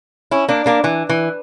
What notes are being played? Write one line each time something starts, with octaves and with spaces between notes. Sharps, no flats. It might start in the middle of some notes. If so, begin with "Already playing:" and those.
C#4 E4
A#3 D4
A#3 D4
E3
E3